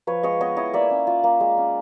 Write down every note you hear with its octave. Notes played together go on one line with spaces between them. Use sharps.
F3 B4 C#5
G#3 C#5 D#5
B3 C#5 D#5
E4 C#5 D#5
A#3 D5 E5
C#4
F4
A#3
G#3
C#4